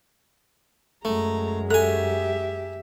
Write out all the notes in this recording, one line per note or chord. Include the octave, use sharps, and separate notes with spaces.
F#2 G#3 A3 A#5
G4 A4 E5 G#5 A#5